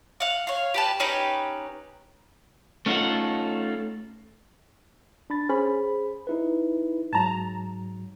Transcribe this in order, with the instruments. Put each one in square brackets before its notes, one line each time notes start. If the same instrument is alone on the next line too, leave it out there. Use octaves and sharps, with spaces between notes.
[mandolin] F5 F#5
C#5 F5
G4 B4 A5
C#4 D#4 G4 B4
[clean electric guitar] A3 C#4 D#4 F4 A4 F#5
[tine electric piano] D4 B5 A6
[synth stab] C#4 [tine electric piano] G#4 C5 B5
[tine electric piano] D#4 E4 B4
[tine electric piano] G#2 F#3 [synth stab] A5 A#5